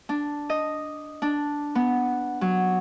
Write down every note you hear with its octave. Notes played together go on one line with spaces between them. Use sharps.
D4
D#5
D4
B3
F#3